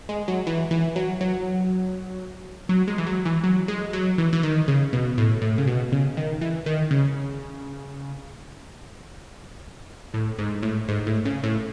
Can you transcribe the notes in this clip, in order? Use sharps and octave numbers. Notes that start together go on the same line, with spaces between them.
G#3
F#3
E3
E3
F#3
F#3
F#3
G#3
E3
F#3
E3
F#3
G#3
F#3
E3
E3
D#3
C#3
B2
A2
A2
C#3
B2
C#3
D#3
E3
D#3
C#3
A2
G#2
A2
G#2
A2
C#3
A2